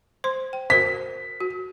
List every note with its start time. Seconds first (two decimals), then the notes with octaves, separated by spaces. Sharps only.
0.24 C5 C6
0.53 G5
0.70 F#4 A#4 C5 B6
1.40 F#4